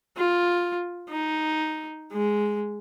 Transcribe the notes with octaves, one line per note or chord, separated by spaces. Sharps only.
F4
D#4
G#3